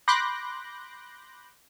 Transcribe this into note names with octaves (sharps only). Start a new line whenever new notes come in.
B5 C6 D6 F#6 G6 A#6